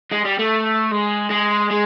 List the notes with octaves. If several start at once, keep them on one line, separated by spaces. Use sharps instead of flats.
G#3
G3
A3
G#3
G#3
G#3